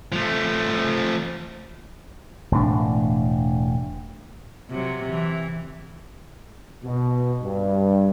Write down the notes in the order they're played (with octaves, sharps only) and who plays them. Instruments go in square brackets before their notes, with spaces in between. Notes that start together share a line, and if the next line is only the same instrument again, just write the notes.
[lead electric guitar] F3 A3
[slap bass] E1 A2 D4
[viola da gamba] C3 F#3
E3
[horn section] B2
G2